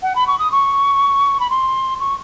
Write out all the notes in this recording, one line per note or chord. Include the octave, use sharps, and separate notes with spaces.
F#5
B5
C#6
D#6
C#6
B5
C6
C#6